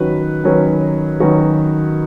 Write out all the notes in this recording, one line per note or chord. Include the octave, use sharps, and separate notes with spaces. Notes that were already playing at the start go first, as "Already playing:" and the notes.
Already playing: D#3 F#3 C#4 F#4 B4
D#3 F#3 C#4 F#4 B4
D#3 F#3 C#4 F#4 B4